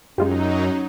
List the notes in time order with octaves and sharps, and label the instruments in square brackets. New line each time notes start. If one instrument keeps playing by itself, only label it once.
[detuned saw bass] F#2 [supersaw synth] F#3 D#4 [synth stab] G#3 F4 G4 [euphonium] C#4